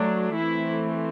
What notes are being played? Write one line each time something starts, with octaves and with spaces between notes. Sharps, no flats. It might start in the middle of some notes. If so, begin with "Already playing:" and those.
Already playing: F#3 A3 D4
E3 A3 C4 E4